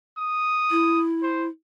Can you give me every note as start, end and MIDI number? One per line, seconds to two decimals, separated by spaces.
0.18 1.01 87
0.71 1.48 64
1.22 1.47 72